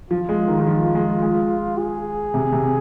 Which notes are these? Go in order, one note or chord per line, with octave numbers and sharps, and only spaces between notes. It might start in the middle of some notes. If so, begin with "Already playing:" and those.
F3 F4
G#3
D#3
D#3
F3
G#3
G#3
G#4
C3
C3